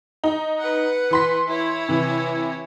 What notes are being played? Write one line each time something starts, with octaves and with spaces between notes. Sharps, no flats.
D#4
B4 F#5
E3 C6 B6
E4 C#5
C3 E3